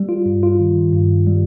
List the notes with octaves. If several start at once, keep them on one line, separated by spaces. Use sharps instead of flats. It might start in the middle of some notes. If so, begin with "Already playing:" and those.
Already playing: G3
F4
G2
F4
D#3
G2
G3